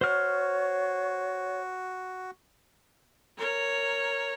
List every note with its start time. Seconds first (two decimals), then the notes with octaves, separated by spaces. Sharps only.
0.01 F#4 C5 C#5 F6
3.38 A#4 C#5